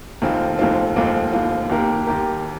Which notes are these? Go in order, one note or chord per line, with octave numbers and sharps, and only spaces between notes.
F1 D#2 D#3 C4 F4
F1 D#2 D#3 C4 F4
F1 D#2 D#3 C4 F4
F1 D#2 D#3 C4 F4
D#2 D#3 A#3 G4 A#4
D#2 D#3 A#3 G4 A#4